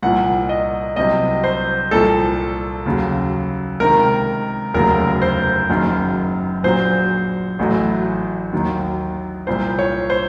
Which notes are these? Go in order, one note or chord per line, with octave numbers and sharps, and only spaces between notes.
C2 A#2 F3 F#5
D#5
C2 C3 F#3 D#5
C5
C2 A#2 F3 A4
D#2 C#3 F#3
C#2 C3 D#3 A#4
F1 D#2 C#3 F#3 A#4
C5
F#1 F#2 D#3 F#3
A#1 A#2 F#3 C5
A1 A2 F#3
D#2 D#3 F#3
C2 A#2 F3 C5
C#5
C5